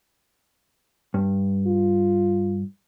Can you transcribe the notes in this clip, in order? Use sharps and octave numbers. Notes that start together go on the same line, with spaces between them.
G2
F4